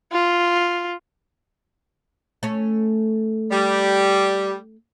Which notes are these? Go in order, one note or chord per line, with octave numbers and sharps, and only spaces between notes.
F4
A3 C#4
G3 G4